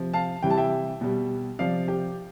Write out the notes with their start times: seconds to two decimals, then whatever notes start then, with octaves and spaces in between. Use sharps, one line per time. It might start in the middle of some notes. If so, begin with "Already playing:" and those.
Already playing: C3 F3
0.13 F5 A5
0.43 C3 E3 G3 G5
0.50 A5
0.58 E5 G5
1.01 B2 G3
1.59 C3 F3 D5 F5
1.88 G4